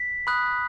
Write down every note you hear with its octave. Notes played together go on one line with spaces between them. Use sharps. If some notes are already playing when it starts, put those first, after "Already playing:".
Already playing: B6
B5 D#6 F#6